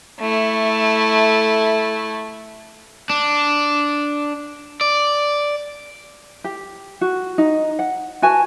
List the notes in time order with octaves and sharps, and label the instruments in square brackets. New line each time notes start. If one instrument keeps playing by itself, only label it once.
[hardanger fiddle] A3 E4
[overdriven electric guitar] D4
D5
[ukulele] G4
F#4
D#4
F#5
F#4 B4 G#5 A5